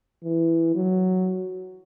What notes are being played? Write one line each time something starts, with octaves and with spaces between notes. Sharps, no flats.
E3
F#3